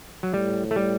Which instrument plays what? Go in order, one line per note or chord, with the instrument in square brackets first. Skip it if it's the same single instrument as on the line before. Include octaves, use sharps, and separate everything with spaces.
[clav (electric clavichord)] F#3
[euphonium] A2 [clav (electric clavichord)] G3
[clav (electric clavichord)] A3
G3